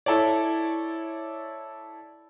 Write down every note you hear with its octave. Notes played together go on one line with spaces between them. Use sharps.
E4 A4 C#5 D5